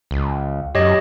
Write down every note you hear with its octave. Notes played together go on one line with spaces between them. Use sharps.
C#2
F#2 G4 C#5 D#5